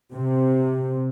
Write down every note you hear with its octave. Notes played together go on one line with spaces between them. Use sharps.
C3